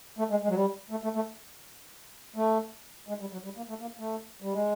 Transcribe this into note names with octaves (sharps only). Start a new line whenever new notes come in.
A3
G#3
G#3
F#3
G3
A3
A3
A3
A3
G#3
G3
F#3
G3
A#3
A3
A#3
A3
G3
G#3